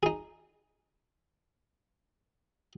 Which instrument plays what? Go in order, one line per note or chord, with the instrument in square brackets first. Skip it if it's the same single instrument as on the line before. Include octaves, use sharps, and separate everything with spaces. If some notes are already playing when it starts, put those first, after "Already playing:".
[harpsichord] D#4 G#4